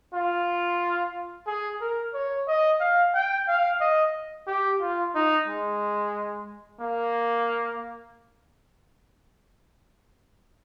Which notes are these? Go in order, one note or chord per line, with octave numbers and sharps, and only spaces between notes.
F4
G#4
A#4
C#5
D#5
F5
G5
F5
D#5
G4
F4
D#4
G#3
A#3